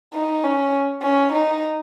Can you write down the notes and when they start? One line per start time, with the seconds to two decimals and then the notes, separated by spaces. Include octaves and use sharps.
0.14 D#4
0.44 C#4
1.02 C#4
1.32 D#4